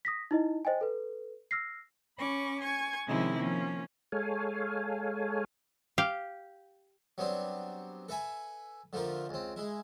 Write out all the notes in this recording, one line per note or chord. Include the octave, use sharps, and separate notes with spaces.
D#6 A#6 B6
D#4 E4 D#5
C5 D#5 G5 G#5
A4 B4
E6 F6 A#6 C7
C#4 B5 C#6 D6
G#5 C#6 G#6
C3 D#3 F3 G#3 C#4 E4
F3 A#3 C#4
G#3 A4 C#5 F5 G#5
G4 F5
F#3 G3 B3 C4 D4
A4 B4 E5 G#5 B5
D3 F3 A3 F4 A#4
C#2 C4
G#3 E4